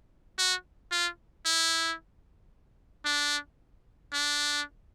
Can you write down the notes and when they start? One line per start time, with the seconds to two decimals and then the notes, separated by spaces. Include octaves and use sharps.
0.38 F#4
0.91 F4
1.45 E4
3.05 D4
4.13 D4